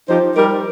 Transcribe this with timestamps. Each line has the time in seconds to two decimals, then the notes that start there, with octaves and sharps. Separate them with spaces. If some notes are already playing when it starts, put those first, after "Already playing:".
0.07 F3 D#4 G4 C5
0.35 G3 D#4 G4 A#4